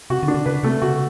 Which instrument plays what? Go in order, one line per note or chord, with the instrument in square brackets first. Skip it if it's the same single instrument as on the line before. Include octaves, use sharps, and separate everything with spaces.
[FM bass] C3 [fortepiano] F#4
[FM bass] D3
[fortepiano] D4
[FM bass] D3
[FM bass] C#3 [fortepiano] B4
[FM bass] C3 [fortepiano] A3
[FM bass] C#3 [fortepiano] F#4